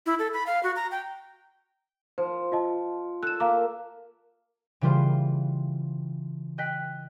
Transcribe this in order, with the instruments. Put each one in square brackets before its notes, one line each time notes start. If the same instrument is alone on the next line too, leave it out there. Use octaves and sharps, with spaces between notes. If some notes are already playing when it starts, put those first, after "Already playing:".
[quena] E4
A4
B5
F5
F#4
A#5
G5
[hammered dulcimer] F3 [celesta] C5
[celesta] F4 D#5 A5
[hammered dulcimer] A4 [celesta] F#6 E7
[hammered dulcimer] A#3 E5 [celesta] F5 A#5 D6
[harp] C#3 E3 G3 F4 C5
D#5 G5 F#6 B6